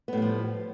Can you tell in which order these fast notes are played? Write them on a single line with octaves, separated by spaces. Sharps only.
B3 A2 G3 F3